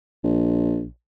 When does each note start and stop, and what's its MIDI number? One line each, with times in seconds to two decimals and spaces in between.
0.24 0.86 34